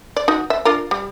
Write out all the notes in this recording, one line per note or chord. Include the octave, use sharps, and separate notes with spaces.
D5
D#4 F#4
E5
D4 F4 A#4
G3